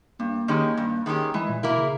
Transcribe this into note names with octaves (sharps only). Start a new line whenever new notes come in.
G2 A#3
D#3 G#3 C#4 G4
G2
D#3 G#3 C#4 G4
E3 G#3
A#2
B2 A#3 E4 A#4
C#3